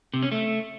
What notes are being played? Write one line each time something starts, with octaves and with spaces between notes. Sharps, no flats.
C3
C#4
A3